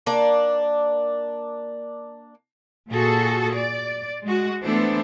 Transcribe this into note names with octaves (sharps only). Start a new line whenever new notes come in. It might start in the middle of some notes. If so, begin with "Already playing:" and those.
A#3 D4 D5
A#2 F#4 G#4 A4
D5
G#3 F#4
E3 A3 B3 D4 A4 C5